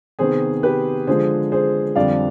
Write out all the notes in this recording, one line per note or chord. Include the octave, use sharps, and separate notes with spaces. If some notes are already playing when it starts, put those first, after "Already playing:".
C3 D#3 B3 G#4 C5
G4 B4
D3 F3 G#3 G#4 C5
G#4 C5
F2 D3 G3 D5 F5